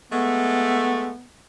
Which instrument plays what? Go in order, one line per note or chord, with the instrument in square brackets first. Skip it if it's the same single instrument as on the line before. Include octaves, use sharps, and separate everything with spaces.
[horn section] G#3 A3 [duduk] B3